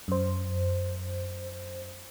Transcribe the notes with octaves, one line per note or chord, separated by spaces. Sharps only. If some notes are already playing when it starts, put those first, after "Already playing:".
F#2 C5